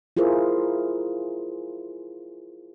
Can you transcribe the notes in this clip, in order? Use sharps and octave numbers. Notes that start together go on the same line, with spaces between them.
E4 F4 G#4 A#4 C5